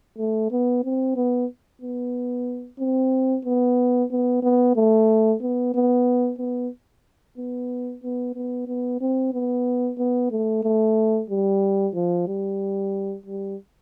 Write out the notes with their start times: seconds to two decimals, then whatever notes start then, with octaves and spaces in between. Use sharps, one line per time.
0.18 A3
0.51 B3
0.84 C4
1.16 B3
1.81 B3
2.79 C4
3.45 B3
4.11 B3
4.43 B3
4.76 A3
5.42 B3
5.74 B3
6.39 B3
7.38 B3
8.03 B3
8.35 B3
8.68 B3
9.01 C4
9.33 B3
9.98 B3
10.31 A3
10.63 A3
11.30 G3
11.94 F3
12.28 G3
13.26 G3